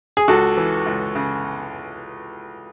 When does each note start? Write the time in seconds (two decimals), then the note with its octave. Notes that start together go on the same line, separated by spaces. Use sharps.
0.17 G#4
0.28 C#2 F#4 A4
0.57 E3
0.86 C#2
1.15 C#3